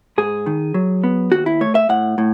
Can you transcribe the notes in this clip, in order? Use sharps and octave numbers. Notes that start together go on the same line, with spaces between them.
G#2 G#4
D#3
F#3
B3
D#2 F#4
E4
A3 C#5
E5
A2 F#5
A2